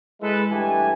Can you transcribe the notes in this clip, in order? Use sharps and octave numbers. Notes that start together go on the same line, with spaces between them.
G#3 E4 A4 B4
G2 E3 A3 G4 G#5